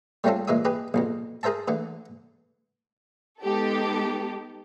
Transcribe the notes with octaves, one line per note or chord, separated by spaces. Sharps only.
G3 A3 C4 C#4 F4 A4
A#2 E3 G#3 E5 D#6
G4 G#4 B4
A#1 F2 B2
G#4 A#4 C5 E5 A5
D3 E3 A3
G#3 B3 D#4 G4 A4